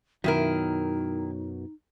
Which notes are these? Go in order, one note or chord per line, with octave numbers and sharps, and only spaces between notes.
F#2 B2 D#3 F#3 D#4 E4 A#4